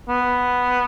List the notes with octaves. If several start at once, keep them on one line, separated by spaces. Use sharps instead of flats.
B3